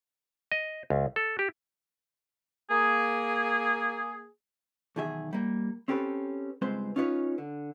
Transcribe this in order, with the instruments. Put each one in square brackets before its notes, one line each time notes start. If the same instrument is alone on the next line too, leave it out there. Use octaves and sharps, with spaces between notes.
[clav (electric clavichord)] D#5
C#2
A4
G4
[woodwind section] A#3 G#4
[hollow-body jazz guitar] B1 E2 D#3 G#4 E5
G3 A#3
C4 C#4 G4 A4 B4
C#2 G2 G#3 C4 B4 C5
C#4 D#4 F4 B4 C#5
D3